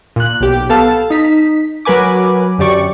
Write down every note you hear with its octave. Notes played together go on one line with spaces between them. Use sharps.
A#2 F#6
B1 G4
B3 A4 F5 A5
D#4 B6
F#3 A#4 B4 G#5 D6
F#2 D3 G4 D5 C#6